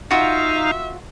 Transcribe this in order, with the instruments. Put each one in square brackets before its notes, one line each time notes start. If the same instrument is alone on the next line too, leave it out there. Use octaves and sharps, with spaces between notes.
[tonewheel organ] D#4 F5 [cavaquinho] F4 F#4 [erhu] E5